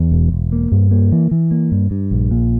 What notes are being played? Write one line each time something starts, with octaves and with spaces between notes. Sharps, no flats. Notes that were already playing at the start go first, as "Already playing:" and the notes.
Already playing: E2
E1
E1
A#3
G2
A#3
E3
E3
A#3
G2
G2
A#1
A#2